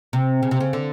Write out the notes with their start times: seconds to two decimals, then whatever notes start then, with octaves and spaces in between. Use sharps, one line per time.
0.13 C3
0.43 C#3
0.51 C3
0.60 C#3
0.73 D3